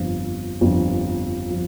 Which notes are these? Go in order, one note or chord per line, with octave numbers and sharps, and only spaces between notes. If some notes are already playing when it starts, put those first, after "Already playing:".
Already playing: G1 F2 F3
G1 F2 F3
F3